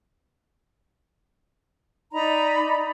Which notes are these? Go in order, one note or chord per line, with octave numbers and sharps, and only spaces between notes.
D#4 D5 A#5 B5